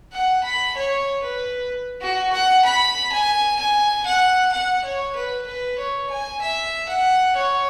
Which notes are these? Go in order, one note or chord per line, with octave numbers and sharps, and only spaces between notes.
F#5
B5
C#5
B4
F#4
F#5
B5
G#5
G#5
F#5
F#5
C#5
B4
B4
C#5
G#5
E5
F#5
C#5